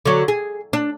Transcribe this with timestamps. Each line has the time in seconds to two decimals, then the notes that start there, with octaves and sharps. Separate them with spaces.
0.06 D3 F#3
0.28 G#4
0.73 D4